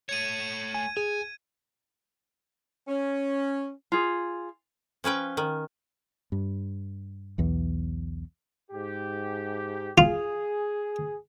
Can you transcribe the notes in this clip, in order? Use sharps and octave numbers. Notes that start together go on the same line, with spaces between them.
A3 C#5 G#6 D#7
G#5
G#4 G#5
C#4
F4 G#4
F3 C#4 B4 G5
D#3
G2
B1 E2 E3
G#2 G4
F4 G#4